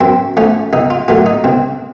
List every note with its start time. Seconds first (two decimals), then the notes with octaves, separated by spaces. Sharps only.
0.01 F#2 C4
0.37 F3 A3 C#4
0.73 C2 D#4
0.90 F4
1.08 A#2 F#3 A3 F4
1.26 D#4
1.44 C2 C4